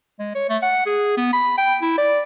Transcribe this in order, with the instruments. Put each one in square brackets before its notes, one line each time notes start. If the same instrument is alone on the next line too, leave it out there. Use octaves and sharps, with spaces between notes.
[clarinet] G#3
C#5
A3
F#5
G#4
B3
B5
G5
E4
D5